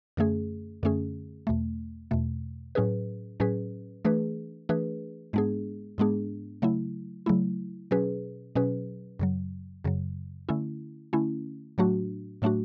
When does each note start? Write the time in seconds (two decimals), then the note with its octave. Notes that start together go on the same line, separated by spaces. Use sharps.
0.17 F#2 D3 A3 C#4 G#4
0.83 F#2 D3 A3 C#4 G#4
1.47 E2 B2 A3
2.11 E2 B2 A3
2.75 A2 F#3 C#4 G#4 B4
3.40 A2 F#3 C#4 G#4 B4
4.05 E3 A3 D4 G#4 B4
4.69 E3 A3 D4 G#4 B4
5.33 G#2 G#3 B3 D4 G#4
5.98 G#2 G#3 B3 D4 G#4
6.62 C#3 F#3 A3 E4
7.26 C#3 F#3 A3 E4
7.91 B2 F#3 C#4 G#4 B4
8.55 B2 F#3 C#4 G#4 B4
9.19 F#2 C#3 F#3
9.84 F#2 C#3 F#3
10.49 D3 A3 C#4 E4
11.13 D3 A3 C#4 E4
11.78 A2 F#3 A3 D4 F#4
12.42 A2 F#3 A3 D4 F#4